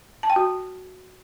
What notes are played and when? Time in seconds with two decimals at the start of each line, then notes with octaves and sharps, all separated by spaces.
0.23 A5
0.30 G5
0.36 F#4